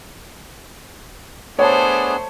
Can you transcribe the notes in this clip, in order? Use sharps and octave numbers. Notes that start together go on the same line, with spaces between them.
A3 B3 D4 G#4 C5 C#5 A5